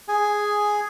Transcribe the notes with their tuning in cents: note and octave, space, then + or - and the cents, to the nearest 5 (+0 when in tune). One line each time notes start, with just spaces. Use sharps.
G#4 +0 G#5 +0